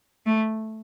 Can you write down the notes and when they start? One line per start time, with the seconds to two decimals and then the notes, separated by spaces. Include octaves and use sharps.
0.26 A3